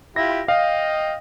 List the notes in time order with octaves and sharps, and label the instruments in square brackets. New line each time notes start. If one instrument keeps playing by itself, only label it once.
[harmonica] E4 F4 G4 [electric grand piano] A#6
[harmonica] D#5 G5 [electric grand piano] F5